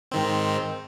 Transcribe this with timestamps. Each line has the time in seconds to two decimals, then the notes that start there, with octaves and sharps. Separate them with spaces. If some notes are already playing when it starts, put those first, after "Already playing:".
0.11 G#2 D#3 C4